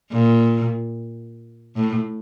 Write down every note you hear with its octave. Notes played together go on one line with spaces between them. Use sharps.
A#2
A2